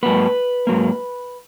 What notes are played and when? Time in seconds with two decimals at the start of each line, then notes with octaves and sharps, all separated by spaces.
0.03 G#2 F#3 A#3 B4
0.67 G#2 F#3 A#3